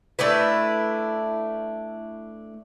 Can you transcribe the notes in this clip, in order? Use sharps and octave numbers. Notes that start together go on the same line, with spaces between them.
A3 D4 E4 B4